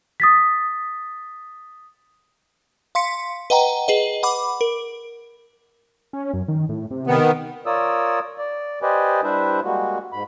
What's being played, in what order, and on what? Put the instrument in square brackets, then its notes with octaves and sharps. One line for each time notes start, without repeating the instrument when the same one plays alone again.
[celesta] D#6 A6 B6
[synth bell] F5 C6 B6 C#7
B4 D#5 F#5 G5 A#5
G#4 B4 D#5
F#5 B5 D6
A#4
[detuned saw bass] C#4
F#2
D#3
A2
C3
[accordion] D#3 B3
F4 A#4 C#5 D5 D#6 E6
D5
G4 B4 C5 D5 D#5 G#5
G3 D4 E4 B4 C5 E5
G3 G#3 A#3 F#4
G#2 B5